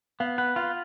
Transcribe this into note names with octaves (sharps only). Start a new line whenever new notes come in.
B3 F5
B4 F#5
F4 F5